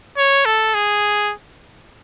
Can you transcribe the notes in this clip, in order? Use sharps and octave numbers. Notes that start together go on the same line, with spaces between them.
C#5
A4
G#4